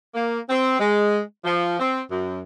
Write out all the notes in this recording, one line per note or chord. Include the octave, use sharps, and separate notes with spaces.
A#3
C4
G#3
F3
C4
F#2